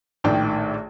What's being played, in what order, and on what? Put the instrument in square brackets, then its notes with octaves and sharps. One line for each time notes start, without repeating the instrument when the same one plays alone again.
[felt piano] A#1 A2 D#3 D5 G5